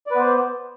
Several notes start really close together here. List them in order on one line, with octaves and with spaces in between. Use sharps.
D5 B4 B3 C5